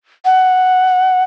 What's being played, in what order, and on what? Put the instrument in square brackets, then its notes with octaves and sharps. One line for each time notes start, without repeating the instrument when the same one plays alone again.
[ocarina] F#5